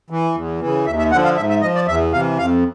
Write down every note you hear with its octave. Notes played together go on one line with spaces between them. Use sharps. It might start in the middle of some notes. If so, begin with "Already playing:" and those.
E3
E2
C#3 E3
D#2 E5
E5
D3 F3 F#5
F5
G#2 E5
E5
F3 D#5
D5
E2 E5
C3 E3 F5
F2 F5